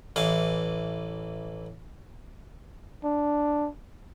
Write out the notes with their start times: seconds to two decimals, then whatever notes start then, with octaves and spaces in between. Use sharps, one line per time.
0.16 A1 E3 F5
3.04 D4